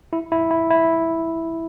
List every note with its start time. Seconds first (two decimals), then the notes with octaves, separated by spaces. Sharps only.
0.13 E4
0.32 E4
0.51 E4
0.70 E4